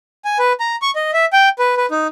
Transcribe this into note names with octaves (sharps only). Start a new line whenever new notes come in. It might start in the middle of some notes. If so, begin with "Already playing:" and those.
G#5
B4
A#5
C#6
D#5
E5
G5
B4
B4
D#4